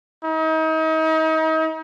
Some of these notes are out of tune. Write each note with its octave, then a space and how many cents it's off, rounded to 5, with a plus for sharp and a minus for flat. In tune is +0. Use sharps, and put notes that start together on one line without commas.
D#4 +35